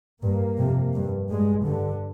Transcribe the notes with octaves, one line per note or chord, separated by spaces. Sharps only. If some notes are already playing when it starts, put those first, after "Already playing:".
G2 A#3
F2 C3
G2
G2 G#3
G2 D3